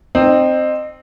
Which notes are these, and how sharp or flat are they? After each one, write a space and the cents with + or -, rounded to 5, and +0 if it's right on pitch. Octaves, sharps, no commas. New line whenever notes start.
C4 +0 D#4 -30